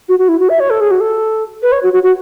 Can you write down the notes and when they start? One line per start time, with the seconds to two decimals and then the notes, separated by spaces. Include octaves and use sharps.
0.09 F#4
0.19 F#4
0.29 E4
0.40 F#4
0.49 E5
0.60 C#5
0.70 A4
0.81 G#4
0.91 F#4
1.00 A4
1.63 B4
1.72 C#5
1.83 F#4
1.93 F#4
2.03 F#4